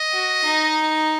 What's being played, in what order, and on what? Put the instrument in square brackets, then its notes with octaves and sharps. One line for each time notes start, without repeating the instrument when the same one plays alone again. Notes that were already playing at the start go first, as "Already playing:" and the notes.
Already playing: [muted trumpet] D#5
[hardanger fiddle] F#4
D#4